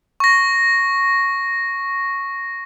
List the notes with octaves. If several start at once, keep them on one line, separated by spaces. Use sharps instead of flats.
C#6 A#6